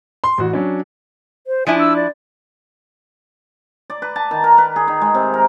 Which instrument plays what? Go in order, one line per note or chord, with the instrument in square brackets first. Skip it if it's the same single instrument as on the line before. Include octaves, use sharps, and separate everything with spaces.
[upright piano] C6
A1 F#4
F#3 C#4 D4
[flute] C5
[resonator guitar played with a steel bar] F3 D4 E4 [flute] G#5
[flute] E6
D5
[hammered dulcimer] D5
B4
A5
D#3
A#4
B4
G#4
D#3
G#3
C3
A#4